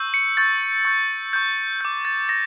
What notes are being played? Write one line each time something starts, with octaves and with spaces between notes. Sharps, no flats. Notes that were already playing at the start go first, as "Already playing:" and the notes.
Already playing: C#6 E6 G6
C#7
C#6 E6 G6 A6
C#6 G6
C#6 G6
D6 G6
A6
D6 A#6